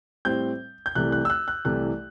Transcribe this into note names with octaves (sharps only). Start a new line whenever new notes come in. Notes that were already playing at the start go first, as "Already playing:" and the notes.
A2 G3 C4 G6
G6
C2 C3 E3 A3 F#6
F#6
E6
F#6
F#6
C2 C3 E3 A3 F#6